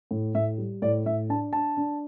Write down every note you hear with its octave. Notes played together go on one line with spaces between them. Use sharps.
A2
A2 E5
G3
A2 D5
A2 E5
D4 A5
D4 A5
D4